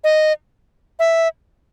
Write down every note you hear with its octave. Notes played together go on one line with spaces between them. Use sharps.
D#5
E5